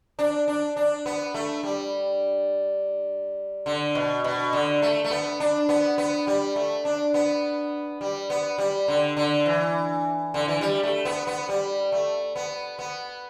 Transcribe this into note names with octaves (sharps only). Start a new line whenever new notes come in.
D4
D4
D4
B3
A3
G3
D3
B2
B2
D3
A3
A3
B3
D4
B3
B3
G3
A3
D4
B3
G3
B3
G3
D3
D3
E3
D3
E3
G3
A3
B3
B3
G3
A3
B3
B3